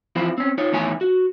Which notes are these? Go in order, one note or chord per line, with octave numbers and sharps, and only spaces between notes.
E3 F3 C4 E4 F4
C4 C#4
D#4 F4 C#5
E2 A2 D#3 C#5 E5 G#5
F#4